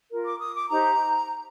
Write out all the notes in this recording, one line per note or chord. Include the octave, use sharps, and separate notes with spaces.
F4 A#4
D6
D#6
D6
D#4 G4 C5 A#5